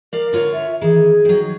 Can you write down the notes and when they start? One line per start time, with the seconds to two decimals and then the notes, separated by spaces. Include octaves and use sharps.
0.13 A#4 D5 F5
0.33 D3 F4 C#5
0.53 E5
0.81 D#3 E3 G#4
1.25 D#3 F#3